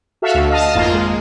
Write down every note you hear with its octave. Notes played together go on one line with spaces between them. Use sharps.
F#4 A4 E5 F5
D2
D#5 F5 A5
G#1 F2 A#3 F4
G#3